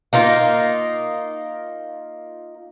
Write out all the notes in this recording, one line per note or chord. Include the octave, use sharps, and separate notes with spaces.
A#3 D#4 F4